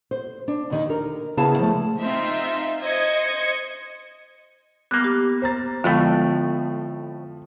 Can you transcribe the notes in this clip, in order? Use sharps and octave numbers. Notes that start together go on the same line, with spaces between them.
C5
D4
D#2 D#3
A#4
C#3 B3 E4 G#4 F5 A5
F3 A3
C4 D#4 F4 E5
C5 D#5 G#6 C#7
G3 A#3 B3 F#6
G4
C5 A#5 A6
F2 A2 D3 F3 G#3 A3 B3